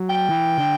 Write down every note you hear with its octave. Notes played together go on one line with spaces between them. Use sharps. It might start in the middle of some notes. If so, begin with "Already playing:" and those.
Already playing: F#3
G5
E3
D3